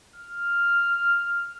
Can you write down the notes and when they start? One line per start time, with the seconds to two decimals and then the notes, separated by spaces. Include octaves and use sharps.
0.16 F6